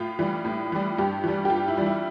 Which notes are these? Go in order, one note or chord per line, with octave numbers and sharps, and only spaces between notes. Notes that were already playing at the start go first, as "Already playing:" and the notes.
Already playing: A2 F4
E3 G3
A2
E3 G3
G2 G4
E3 G3
G4
G2 F4
E4
E3 G3
E4